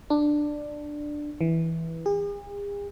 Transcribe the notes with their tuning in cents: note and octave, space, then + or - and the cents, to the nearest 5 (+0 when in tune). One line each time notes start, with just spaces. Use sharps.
D4 +10
E3 -10
G#4 -45